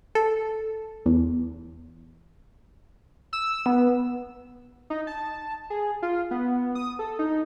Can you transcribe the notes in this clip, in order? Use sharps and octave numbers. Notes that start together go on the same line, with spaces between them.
A4
E2
E6
B3
D#4
A5
G#4
F4
B3
D#6
A4
D#4